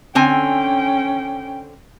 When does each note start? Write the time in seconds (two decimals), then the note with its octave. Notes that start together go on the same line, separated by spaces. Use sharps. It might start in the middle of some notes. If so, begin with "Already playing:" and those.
0.15 D3 C4 C#4 G5 G#5